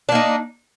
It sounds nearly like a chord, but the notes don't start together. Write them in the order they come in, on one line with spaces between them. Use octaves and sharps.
D4 A#3 D#4